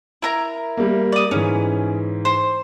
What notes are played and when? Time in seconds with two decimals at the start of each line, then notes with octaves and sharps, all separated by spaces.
0.22 E4 A#4 A#5
0.77 G3 A#3
1.12 D5 D#6
1.31 G#2 E3 C#4
2.25 C5